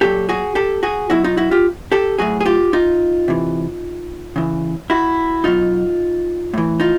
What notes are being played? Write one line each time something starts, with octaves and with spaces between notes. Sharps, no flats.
A#2 F#3 G4 A4
F#4 G#4
G4 A4
F#4 G#4
B2 F#3 E4 F#4
D#4 F4
E4 F#4
F4 G4
G4 A4
A2 F#3 F#4 G#4
G#4
F4 G4
D#4 F4
C3 E3
C#3 E3
E4 F#4
B2 F#3 D#4 F4
A2 E3
D#4 F4